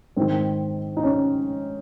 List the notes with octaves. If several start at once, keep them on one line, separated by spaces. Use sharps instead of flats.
G#2 D#3 C4
D#4
C#4